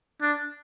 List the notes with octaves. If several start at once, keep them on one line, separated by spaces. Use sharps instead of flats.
D4